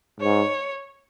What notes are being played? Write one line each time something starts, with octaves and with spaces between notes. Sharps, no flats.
G#2 C#5